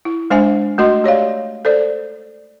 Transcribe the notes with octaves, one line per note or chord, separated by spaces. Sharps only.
E4
G#3 D4 C5 E5 G#5
A3 F#4 D#5 C6
G4 C#5 D5 F5
A4 C5 D5